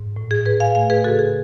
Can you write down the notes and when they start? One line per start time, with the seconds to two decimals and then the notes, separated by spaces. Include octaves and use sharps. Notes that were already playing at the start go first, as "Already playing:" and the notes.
Already playing: G#2
0.16 A2
0.31 G#4
0.45 A2 G#4 B4
0.60 F5 G#5
0.75 A3 F5 G#5
0.90 G#4 B4
1.04 C#3 F#4 A4
1.19 G#4